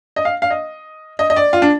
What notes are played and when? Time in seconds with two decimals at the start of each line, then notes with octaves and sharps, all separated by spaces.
0.16 D#5
0.25 F5
0.42 F5
0.50 D#5
1.19 D#5
1.30 D#5
1.36 D5
1.53 F4
1.62 D4